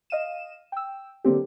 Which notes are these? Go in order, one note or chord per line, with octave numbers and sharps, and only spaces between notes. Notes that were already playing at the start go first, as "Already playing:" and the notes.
D#5 F5 D#7 E7
G5 E6
D3 F#3 A#3 C4 G4